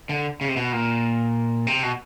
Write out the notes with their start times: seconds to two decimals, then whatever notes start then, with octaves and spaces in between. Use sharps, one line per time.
0.09 D3
0.41 C#3
0.48 C3
0.56 B2
0.72 A#2
1.67 C3
1.83 B2